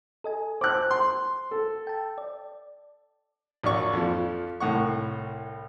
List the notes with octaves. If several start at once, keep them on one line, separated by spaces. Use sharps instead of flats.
A4 D#5 G#5
C5 A5 D6 F#6
C6
A4
G5 A5
D5
A#1 F#3 D4 D5 C#6
F2 F3
C2 A2 F#5 C#6